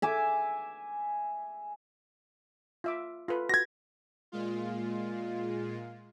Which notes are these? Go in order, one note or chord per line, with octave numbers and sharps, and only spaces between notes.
E5 G#5 D6
F4 E5 D6
F4 A4 B4
F#4 G#6 A#6
A#2 G#3 F4